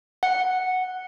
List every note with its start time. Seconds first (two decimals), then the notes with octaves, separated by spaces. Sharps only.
0.23 F#5